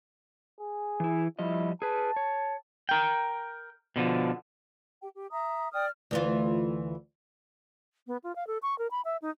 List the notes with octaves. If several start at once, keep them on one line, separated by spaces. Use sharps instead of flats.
G#4
E3 E4
F3 G3 E4 D#5
G#4 B4 A5
C#5
A#4 G5
B2 D3 F3
G4 G5
G4
E5 A#5 D#6
D5 G5 D#6 F6
D2 E3 F4
B3
F4
F5
A4
C#6
A#4
B5
E5
D#4